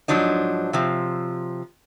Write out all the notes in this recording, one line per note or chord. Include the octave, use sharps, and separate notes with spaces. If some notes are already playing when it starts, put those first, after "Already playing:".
G#2 F3 F#3 D4 D#4
C3 F3